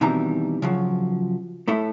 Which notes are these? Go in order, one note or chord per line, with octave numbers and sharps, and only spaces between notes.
B2 D#3 E3 G3 C4 A#5
C#3 F3 F#3
A2 A3 E4 A4